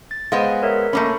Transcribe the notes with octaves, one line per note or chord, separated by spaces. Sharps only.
A6
G#3 B3 C5 F5 G#5 A#6
A#4 C#5 E5
A3 A#3 C#4 B5